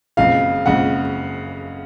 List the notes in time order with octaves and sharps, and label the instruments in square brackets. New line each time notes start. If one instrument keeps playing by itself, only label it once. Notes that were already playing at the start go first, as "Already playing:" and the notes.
[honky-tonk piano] F#1 F2 C#3 G#3 [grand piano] F5
[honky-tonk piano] F#1 F2 C#3 G#3 [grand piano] F#5